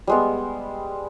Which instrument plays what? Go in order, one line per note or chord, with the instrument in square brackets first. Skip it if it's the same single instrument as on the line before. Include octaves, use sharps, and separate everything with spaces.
[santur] G3 G#3 B3